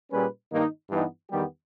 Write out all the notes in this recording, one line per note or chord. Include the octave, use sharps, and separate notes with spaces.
A#2 G3 C#4 G#4 B4
G2 D#3 A#3 D#4
G2 E3 G3 B3 D#4
E2 D#3 G3 B3 G4